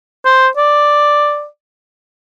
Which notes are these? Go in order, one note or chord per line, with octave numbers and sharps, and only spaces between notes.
C5
D5